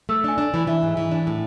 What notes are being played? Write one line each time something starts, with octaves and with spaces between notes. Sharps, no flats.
A3 E6
D4 G#5
D4
E3
E3 E5
G#2
E3
D4
A2